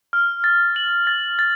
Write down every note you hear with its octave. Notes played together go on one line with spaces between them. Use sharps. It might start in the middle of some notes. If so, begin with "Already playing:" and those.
F6
A6
F#7
A6
A6